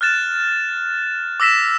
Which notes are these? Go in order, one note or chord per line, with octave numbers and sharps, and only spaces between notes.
F6 F#6 A6 E7
D6 E6 A#6 B6 E7